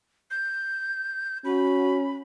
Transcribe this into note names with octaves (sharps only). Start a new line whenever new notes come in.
G6
C#4 F#4 B5